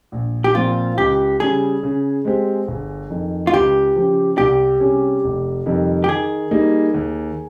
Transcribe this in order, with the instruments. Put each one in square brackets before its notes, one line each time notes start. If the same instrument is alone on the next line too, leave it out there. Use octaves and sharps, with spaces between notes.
[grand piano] A#1
[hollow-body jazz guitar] G4
[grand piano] A#2 F3 C4 [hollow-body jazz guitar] F4
[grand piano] C#2 [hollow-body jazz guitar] G4
[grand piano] C#3 G3 [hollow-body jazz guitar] G#4
[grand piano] C#3
G#3 C4 G4
G1
F2 D#3
[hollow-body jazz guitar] F4
[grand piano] C#2 [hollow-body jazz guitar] G4
[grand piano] C#3 F3
[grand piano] C2 [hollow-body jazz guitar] G4
[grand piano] C3 G3 C#4 G#4
F1
F2 C3 D#3 G3
[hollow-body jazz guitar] G4
[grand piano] D#3 [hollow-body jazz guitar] G#4
[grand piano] G3 A#3 D#4
D#2